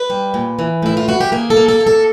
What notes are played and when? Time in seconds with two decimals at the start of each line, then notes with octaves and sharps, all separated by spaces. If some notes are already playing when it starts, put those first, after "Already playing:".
Already playing: B4
0.10 G3
0.34 A#2
0.59 E3
0.83 A2 E4
0.97 F4
1.08 E3 F#4
1.21 G4
1.32 A#3 G#4
1.50 A4
1.57 A#3
1.68 A4
1.81 A#3
1.87 A4